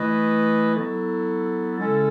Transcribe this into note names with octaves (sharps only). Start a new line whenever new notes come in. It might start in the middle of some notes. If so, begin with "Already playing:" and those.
Already playing: E3 A3 E4 B4 D#5
F#3 B3 E4 A4
C#3 G#3 C#4 E4 A4